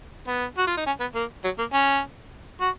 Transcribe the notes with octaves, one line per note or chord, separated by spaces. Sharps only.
B3
F#4
F4
D#4
C#4
B3
A#3
F#3
A#3
C#4
F#4